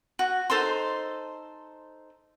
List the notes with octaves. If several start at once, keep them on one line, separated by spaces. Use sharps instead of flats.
F#4
D#4 A4 C5 C6